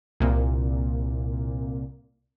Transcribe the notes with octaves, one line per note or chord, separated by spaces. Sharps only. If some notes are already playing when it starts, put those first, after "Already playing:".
C2 A#2